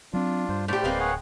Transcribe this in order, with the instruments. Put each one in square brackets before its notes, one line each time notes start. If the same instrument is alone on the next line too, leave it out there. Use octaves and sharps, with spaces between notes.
[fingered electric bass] F#3 C4 [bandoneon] D4 F4
[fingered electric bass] G2 [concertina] C5
[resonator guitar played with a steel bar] A2 G4 [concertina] C5 D5
[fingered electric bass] D1 [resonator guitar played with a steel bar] G#3 A#3 C4 [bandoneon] B4 F5
[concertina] G#4 C#5 F#5